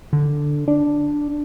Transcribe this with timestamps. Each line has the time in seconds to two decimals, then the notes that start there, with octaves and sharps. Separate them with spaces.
0.13 D3
0.68 D4